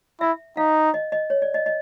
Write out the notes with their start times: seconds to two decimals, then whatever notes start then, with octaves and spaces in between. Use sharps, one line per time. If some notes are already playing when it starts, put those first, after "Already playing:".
0.21 E4 E5
0.57 D#4 F5
0.94 D#5
1.12 D#5
1.30 C#5
1.42 D5
1.54 D#5
1.66 D#5